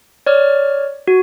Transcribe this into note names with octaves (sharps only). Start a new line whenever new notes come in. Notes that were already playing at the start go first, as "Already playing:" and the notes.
C#5 D5 F6
F#4